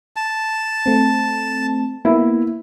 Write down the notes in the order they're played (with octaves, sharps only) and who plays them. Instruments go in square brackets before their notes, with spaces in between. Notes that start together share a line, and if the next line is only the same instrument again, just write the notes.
[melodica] A5
[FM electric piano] A3 C4
[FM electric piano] A#3 B3 [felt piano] E4